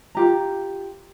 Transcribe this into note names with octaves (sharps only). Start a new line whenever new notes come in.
F4 G4 A#5